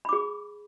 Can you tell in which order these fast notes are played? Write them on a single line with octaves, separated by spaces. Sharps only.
B5 D6 G#4